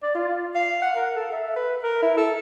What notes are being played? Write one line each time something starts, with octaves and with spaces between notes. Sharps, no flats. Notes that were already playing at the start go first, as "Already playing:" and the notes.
D5
F4
F5
F#5
A#4
A4
E5
B4
A#4
E4
A4